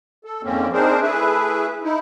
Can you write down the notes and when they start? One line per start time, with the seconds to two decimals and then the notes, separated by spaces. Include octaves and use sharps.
0.24 A4
0.43 F2 G#2 D3 A#3 C4 C#4
0.72 C4 D4 D#4 G#4 A#4 C5
1.02 A3 E4 G#4 B4 E5
1.83 D#4 E4